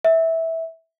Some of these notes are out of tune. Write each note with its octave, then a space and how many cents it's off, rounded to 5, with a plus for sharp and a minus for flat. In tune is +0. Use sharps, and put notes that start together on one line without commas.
E5 -15